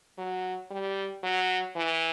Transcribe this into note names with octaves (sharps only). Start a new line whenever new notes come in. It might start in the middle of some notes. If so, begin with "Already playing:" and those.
F#3
G3
F#3
E3